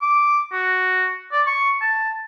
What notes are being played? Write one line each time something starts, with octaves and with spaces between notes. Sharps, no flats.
D6
F#4
D5
C#6
A5